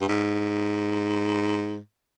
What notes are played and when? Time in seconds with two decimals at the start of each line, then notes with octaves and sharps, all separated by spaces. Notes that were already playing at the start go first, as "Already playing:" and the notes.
0.01 G2
0.08 G#2